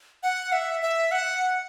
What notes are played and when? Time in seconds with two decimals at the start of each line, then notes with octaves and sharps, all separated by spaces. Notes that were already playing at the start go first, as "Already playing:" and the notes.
0.23 F#5
0.52 E5
0.82 E5
1.11 F#5